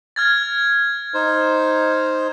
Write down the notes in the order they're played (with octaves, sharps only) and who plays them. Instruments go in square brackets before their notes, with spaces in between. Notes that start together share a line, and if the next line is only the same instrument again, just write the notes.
[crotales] F6 G#6 A6
[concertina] D#4 C5